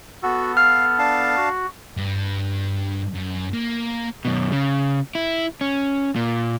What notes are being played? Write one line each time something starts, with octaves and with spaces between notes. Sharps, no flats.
B3 F#4 A4
F5 F6
D4 F5 A5
F#4
G2
F#2
A#3
F#2 B2
C#3
E4
C#4
A#2